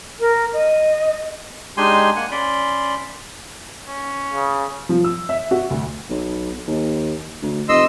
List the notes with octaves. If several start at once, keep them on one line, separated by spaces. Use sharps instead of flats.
A#4
D#5
G#3 D4 D#4 G4 G#5 C6
A#3 F#5 G#5
C#4 D5 B5 C6
C#4
C#3
F3
E6
E5
F#4
D2
B1
D#2
D2
F1 D#5 C6 E6